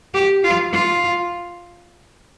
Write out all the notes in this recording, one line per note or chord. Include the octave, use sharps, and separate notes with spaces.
G4
F4
F4